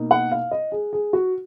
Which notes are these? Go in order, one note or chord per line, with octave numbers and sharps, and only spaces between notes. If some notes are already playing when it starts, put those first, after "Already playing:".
Already playing: B2 A#3 D#4
F#5
F5
D#5
G#4
G#4
F#4